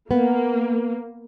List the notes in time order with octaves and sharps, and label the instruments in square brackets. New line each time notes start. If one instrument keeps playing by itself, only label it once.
[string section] A#3 [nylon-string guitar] B3